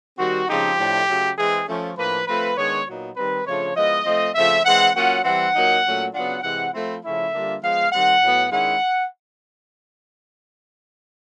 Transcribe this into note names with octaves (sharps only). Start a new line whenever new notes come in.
D#3 G3 C4 F#4
C#3 F3 G#3 C4 D#4 G4
A2 F3 A3 D4
C#3 F#3 A3
E3 G#3 C4 G#4
F3 A3 C#4
A2 F3 A#3 D4 B4
F3 A3 C4 F4 B4
D#3 G#3 B3 D4 C#5
A#2 F#3 B3 D#4
D#3 G3 C4 D#4 B4
C#3 F3 A3 D4 F4 C#5
F3 G#3 B3 E4 D#5
F3 A3 C4
C#3 F3 A3 C4 F4 E5
E3 G#3 C4 F#5
F#3 A#3 C#4 F4 F#5
E3 G3 C4 F#5
A#2 F#3 A#3 D#4
A#2 F#3 A3 C#4
C#3 F#3 B3 D4 F4 F#5
C3 E3 G#3 C4 F#5
F3 A3 C4 E4
C#3 F3 A3 C#4 E4 E5
D3 G3 A#3 D4 F4
F3 G#3 B3 F5
D#3 G3 C4 F#5
A2 F#3 B3
D#3 G#3 C#4 E4 F#5